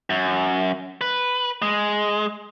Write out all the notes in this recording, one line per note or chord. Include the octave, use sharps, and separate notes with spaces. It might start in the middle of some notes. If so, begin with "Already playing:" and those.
F#2
B4
G#3